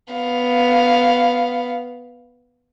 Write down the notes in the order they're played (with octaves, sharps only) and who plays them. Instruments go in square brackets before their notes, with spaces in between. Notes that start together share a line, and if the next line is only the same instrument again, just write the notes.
[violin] B3 F5